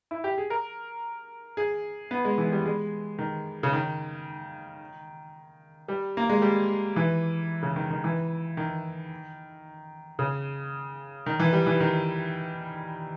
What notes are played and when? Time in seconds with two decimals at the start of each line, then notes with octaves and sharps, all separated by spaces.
0.11 E4
0.24 G4
0.38 G#4
0.50 A#4
1.57 G#4
2.11 B3
2.25 G#3
2.38 E3
2.52 G3
2.65 G#3
3.18 D#3
3.63 C#3
3.73 D#3
5.88 G3
6.17 A#3
6.29 G#3
6.42 G3
6.96 E3
7.62 C#3
7.76 D#3
7.90 D#3
8.04 E3
8.57 D#3
10.19 C#3
11.26 D#3
11.40 E3
11.53 G3
11.66 E3
11.80 D#3